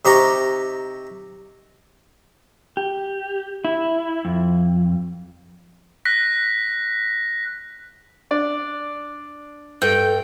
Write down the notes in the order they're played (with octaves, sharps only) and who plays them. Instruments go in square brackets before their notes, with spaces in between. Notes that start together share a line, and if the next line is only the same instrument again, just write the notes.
[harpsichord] C3 D#4 G4 A#5 C#6
[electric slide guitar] G4
E4
F2
[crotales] F#6 A#6 B6
[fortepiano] D4 D5
[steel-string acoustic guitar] G2 [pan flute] A4 [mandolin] G5